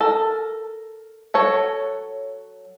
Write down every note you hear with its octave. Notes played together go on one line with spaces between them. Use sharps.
A4 A#4
F#3 A4 C#5